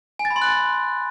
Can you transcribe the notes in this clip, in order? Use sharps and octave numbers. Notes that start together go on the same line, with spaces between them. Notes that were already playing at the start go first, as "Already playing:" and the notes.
G#5
A6
B5
C6
F#6